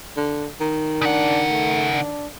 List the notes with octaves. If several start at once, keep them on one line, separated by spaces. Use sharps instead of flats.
D3
D#3
C#3 D4 F#5
A3
D4